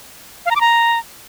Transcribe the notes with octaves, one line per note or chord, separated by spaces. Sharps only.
F5
A#5
D6
A#5